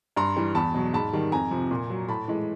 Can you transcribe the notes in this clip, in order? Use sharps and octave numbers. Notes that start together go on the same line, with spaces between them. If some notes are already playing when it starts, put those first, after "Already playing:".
G2 A#5 C6
E3 G3
E2 A5 B5
B2 F#3
G#2 A5 B5
D#3 G3
F2 G#5 A#5
C3 F3
A#2
F#3
A2 A5 B5
E3 G#3